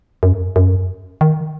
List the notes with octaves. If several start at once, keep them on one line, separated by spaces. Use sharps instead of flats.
F#2
F#2
D#3